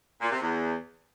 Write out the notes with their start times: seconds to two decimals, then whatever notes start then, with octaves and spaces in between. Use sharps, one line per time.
0.21 A#2
0.31 C3
0.41 E2